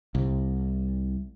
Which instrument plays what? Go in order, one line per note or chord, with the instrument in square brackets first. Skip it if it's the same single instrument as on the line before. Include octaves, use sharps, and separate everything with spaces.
[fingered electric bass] C2